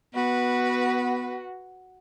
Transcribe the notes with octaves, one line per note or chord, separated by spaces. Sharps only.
B3 F#4 B4